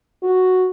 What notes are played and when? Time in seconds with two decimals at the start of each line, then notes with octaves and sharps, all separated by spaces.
0.23 F#4